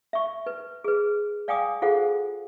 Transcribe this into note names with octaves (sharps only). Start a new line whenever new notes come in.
E5 C#6
B4
G#4 B4
D5 F5 G5 G#5 D6 D#6
F4 G#4 A4 C5 F5 F#5